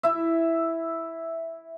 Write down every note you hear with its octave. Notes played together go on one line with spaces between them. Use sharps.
E4 E5